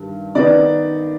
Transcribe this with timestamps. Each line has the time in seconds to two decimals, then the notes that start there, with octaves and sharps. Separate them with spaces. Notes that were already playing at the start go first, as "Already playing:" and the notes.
Already playing: G2 D#3
0.35 D#3 B3 D#4 D5